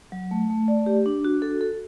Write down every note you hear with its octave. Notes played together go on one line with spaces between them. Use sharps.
F#3
A3
A3
D5
G4
D4
F#4
A4
A4